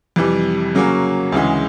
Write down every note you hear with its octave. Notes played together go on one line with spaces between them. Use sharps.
F2 C3 E3 G3
C#3 F#3 A#3 C#4
D2 C#3 E3 G#3